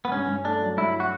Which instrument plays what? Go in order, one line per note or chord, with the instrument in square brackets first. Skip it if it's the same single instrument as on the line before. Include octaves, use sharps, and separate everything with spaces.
[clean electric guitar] B3
[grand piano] G2 [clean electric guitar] C#4
[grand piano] G2
[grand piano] A3 [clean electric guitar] D4
[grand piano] F#3
[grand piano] G2 [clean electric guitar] E4
[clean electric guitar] F#4